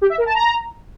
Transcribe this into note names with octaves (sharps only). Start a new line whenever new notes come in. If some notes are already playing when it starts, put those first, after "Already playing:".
G4
E5
A#4
A5
A#5